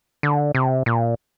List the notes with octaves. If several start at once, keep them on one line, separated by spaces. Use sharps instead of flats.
D3
C3
A#2